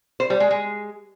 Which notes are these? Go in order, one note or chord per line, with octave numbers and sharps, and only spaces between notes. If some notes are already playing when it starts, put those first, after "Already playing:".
C5
G3
G#3
G#3